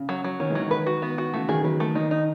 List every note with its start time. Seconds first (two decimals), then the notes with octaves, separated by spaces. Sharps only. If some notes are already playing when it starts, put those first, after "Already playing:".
Already playing: C#3
0.09 F#3
0.24 F#3
0.40 D#3 C#4
0.50 E3 G#3
0.55 D#3 F#3
0.71 B4
0.87 F#4
1.02 B3
1.18 F#4
1.33 C#3 E3 A3
1.48 D#3 F#3 G#4
1.64 D#3 F#3 B4
1.80 A3
1.95 D#3 D#4
2.11 D#4